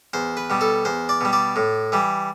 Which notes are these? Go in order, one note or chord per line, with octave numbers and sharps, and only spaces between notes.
E2 C5
B4
B2 G3
A4
E2 C5
D5
B2 G3
D5
A2
E3 G3